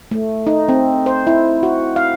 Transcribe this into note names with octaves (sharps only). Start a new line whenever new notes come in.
A3
D#4
C4
C5
E4
F#4
F5